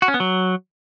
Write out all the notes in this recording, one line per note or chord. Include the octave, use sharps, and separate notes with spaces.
F#4
C#4
B3
F#3